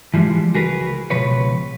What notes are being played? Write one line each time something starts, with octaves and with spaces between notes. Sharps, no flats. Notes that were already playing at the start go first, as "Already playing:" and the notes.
E3 F3 G3 G#3
C#2 F#4 G#4 A#4 B4
C#2 B2 F3 B4 C#5